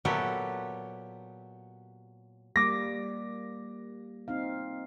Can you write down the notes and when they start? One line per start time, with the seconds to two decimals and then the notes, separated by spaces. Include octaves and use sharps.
0.05 A#2 F#3 B3 G4 A4 E5
2.56 G3 A#3 D6 A#6
4.28 C4 D#4 F5